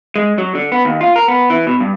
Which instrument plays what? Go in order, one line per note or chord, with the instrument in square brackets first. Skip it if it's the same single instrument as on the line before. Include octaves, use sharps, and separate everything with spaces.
[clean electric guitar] G#3
F#3
D3
B3
D#2
F4
A#4
B3
E3
B2
G2